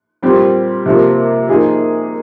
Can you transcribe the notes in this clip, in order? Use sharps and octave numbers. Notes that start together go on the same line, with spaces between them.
A#2 G3 C4 G4
C3 F3 A#3
F3 A#3 D#4 G#4